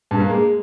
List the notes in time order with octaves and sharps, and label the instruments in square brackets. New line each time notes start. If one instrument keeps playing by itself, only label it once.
[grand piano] G2
A#3
G#3